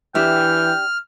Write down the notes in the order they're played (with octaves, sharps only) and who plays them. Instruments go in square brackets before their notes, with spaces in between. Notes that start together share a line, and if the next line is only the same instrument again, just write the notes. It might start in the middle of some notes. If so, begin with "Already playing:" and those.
[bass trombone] E3 [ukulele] D4 G4 E5 [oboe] G5 [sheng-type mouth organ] F6